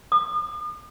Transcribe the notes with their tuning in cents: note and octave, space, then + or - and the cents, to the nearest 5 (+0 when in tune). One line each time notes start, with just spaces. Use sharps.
D#6 -45